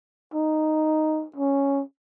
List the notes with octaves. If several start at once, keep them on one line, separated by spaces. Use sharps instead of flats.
D#4
C#4